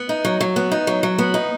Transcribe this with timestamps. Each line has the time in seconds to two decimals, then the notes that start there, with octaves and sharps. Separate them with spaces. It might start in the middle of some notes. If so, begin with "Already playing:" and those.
Already playing: B3
0.09 D#4
0.25 F#3
0.41 F#3
0.56 B3
0.72 D#4
0.87 F#3
1.03 F#3
1.18 B3
1.34 D#4